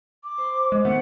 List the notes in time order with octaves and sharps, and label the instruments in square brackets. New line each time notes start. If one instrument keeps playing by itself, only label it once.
[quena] D6
[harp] C5 C6
[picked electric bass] G#3
[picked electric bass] D#3 A3 B3 [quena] F#5